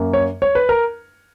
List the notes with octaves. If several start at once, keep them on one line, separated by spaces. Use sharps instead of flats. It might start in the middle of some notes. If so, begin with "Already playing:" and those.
Already playing: F#2 A#3
C#5
C#5
B4
A#4